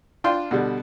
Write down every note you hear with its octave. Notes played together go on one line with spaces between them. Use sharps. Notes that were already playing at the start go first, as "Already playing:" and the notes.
D4 F4 G5 C6
B2 D3 G3